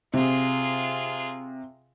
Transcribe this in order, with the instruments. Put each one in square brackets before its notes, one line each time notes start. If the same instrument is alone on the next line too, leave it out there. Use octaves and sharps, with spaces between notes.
[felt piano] C3 [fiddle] F4 G#4